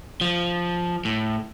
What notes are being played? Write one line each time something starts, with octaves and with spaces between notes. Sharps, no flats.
F3
A2